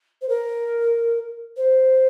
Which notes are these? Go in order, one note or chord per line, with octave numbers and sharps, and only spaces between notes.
C5
A#4
C5